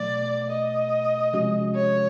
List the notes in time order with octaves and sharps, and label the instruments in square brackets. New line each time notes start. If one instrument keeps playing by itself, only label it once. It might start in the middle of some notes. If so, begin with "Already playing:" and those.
Already playing: [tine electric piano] B2 F#3 A3 [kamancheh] D5
[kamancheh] D#5
[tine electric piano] C3 F3 G#3 C#4 F#4
[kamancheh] C#5